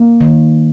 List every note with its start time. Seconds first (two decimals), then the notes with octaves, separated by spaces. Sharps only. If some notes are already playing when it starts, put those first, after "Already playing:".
Already playing: A#3
0.21 D#3